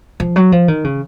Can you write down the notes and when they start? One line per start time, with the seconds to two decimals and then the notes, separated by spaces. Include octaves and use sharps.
0.20 F3
0.36 F#3
0.52 F3
0.68 D#3
0.84 C#3